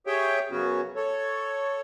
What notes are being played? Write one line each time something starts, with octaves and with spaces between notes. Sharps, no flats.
G4 G#4 C#5 E5 G5
F#2 C#3 B3 C#4 F#4
A4 C#5